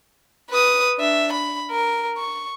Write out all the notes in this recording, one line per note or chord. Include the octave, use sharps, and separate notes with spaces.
B4 D#6
D4 E5
B5
A#4
C#6